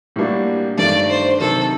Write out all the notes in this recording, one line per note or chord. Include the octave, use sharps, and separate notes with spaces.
A2 G3 A#3 D4 F#4
G2 D#3 A3 D4 D5
C5
C3 D#3 F#3 A4